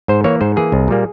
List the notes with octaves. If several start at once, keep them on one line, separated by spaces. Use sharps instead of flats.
G#2 C5
E3 A#3 C#5
G#2 C5
E3 A#3 G#4
C2
A#2 G3 A#3